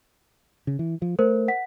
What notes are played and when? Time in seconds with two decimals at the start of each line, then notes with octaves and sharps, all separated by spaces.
0.67 C#3
0.79 E3
1.02 F3
1.19 A3 A#4 C5
1.48 F#5 B6